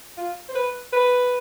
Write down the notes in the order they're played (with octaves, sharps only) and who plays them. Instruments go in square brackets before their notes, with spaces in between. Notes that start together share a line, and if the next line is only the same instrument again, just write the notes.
[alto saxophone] F4
C5
B4
B4